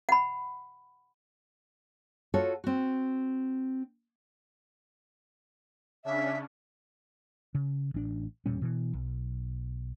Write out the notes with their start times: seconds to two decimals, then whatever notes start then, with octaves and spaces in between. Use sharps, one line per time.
0.09 F#5 B5
2.34 F4 F#4 A4 C#5
2.64 C4 F#4
6.04 C#3 C#4 D4 E5
7.55 C#3
7.94 A1 D4
8.46 E1 A#2 G3 C#4
8.61 B2 E3
8.93 B1